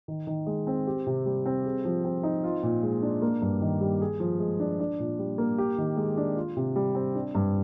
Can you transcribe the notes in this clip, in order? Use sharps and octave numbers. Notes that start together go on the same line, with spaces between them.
D#3
D#3
G#3
C4
G4
C3
G3
C4
G#4
F3
C4
D#4
F4
A#2
G#3
D4
A#3
G2
D#3
G3
G#4
F3
G#3
D4
D4
A#2
G3
A#3
G4
D#3
G#3
D4
F4
C3
G3
C4
D4
G2